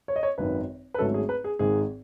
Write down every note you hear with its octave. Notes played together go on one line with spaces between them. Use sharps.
C#5
D#5
C#5
G#1 F#2 D#3 B4
B4
G#1 G#2 F#3 A3 C#4 A4
G#4
B4
G#4
G#1 G#2 D#3 G#4